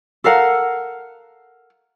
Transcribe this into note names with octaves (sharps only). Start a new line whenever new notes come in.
A4 A#4 F5 F#5